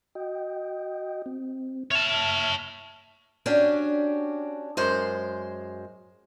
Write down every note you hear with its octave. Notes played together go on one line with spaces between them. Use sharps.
F#4 D#5 G5
C4
C#5 E5 A5 F6
C#4 D4 F#4 G4 D5
F#2 G#3 C5